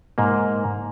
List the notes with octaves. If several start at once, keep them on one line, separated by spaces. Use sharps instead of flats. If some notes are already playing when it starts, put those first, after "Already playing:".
G#2 A#3